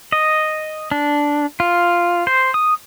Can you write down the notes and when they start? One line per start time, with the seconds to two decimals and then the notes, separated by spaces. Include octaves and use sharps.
0.12 D#5
0.92 D4
1.60 F4
2.27 C5
2.54 D#6